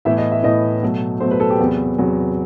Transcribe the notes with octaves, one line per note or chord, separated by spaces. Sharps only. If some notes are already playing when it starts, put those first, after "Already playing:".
A2 E3 B3 E5
D#5
E5
A2 E3 B3 D#5
B2 F#3 A3
B2 F#3 A3 C5
B4
A4
G4
E2 C3 F#3 B3
E2 C3 F#3 B3